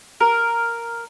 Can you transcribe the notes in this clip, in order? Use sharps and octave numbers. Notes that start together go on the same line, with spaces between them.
A#4